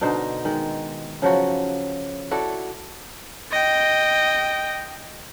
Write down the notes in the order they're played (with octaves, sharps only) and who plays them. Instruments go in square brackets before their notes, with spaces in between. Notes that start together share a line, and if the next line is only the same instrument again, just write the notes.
[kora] B2 D3 D#4 C5
D#3 G#3
C#3 F3 F#3 F#4
E4 F#4 A4 D5
[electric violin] D#5 G5